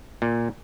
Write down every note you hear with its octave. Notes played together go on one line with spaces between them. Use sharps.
A#2